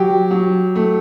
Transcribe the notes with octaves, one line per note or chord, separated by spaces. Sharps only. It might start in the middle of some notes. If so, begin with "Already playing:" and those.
Already playing: F#3 G4
F#3
A3